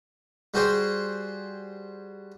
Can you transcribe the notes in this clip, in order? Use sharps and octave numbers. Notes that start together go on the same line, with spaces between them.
G3 F#4 G#4 C5 G5